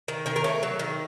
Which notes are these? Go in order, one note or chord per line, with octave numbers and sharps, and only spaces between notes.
D#3
D#3 A#4
A#4
A3 C#5
F#3
D#3